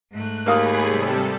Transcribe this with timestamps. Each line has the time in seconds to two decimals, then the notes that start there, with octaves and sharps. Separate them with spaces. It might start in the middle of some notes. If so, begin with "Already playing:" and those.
0.12 G#2 A3 F#6
0.46 D#2 A#3 G#4 F5 B5 D#6
0.85 C3 G3 A4